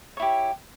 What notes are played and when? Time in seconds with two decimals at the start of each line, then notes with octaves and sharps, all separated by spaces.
0.17 C#5
0.20 E4
0.22 G4